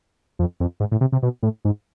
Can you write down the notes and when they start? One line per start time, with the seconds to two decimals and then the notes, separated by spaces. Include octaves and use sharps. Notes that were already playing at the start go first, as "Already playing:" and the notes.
0.39 F2
0.60 F2
0.80 G#2
0.92 A2
1.01 C3
1.12 C3
1.23 B2
1.43 A2
1.65 G#2